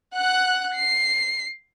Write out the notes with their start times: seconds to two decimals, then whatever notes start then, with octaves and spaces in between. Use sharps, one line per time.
0.14 F#5 F#6
0.75 C7